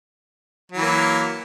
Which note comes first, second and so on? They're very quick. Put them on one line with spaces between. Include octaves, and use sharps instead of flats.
F#3 E3 A#3